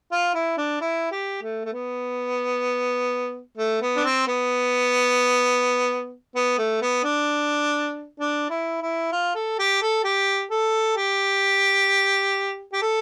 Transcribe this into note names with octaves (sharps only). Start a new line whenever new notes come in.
F4
E4
D4
E4
G4
A3
A3
B3
A3
B3
D4
C4
B3
B3
A3
B3
D4
D4
E4
E4
F4
A4
G4
A4
G4
A4
G4
G4
A4